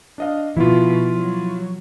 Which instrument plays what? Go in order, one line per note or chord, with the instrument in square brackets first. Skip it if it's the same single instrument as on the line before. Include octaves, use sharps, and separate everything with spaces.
[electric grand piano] D4 D#5 F5
[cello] B2 [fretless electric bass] F3 [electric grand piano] E4 F4
[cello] F#3